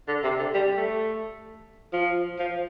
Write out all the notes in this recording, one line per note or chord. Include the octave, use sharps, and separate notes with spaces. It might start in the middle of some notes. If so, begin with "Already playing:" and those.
D3
C3
D3
G3
A3
F3
F3